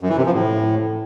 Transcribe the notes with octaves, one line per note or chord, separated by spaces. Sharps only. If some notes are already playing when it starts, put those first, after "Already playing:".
F#2
E3
C3
F3
A2